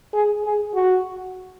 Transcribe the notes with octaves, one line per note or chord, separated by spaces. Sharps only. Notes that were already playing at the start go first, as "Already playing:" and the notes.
G#4
G#4
F#4